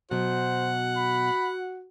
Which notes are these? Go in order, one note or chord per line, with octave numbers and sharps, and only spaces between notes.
B2 F#3 F#4 C5 F#5
B5